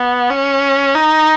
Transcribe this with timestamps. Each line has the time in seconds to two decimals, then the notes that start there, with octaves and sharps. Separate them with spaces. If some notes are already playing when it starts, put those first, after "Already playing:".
Already playing: B3
0.30 C#4
0.95 D#4